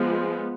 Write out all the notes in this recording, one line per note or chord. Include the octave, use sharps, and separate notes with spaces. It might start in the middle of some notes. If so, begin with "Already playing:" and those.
Already playing: F3 G#3 B3